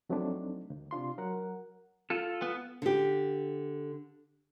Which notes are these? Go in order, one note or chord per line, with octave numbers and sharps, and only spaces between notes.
F2 F#3 A3 C4 D4 D#4
D2
C3 D4 F4 C6
F#3 A#4 F#5
F4 A4
B3
D3 G4